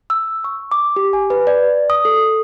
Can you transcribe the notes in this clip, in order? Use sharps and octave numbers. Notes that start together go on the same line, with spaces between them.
E6
C#6
D6
G4
G#5
B4
D5
D#6
A4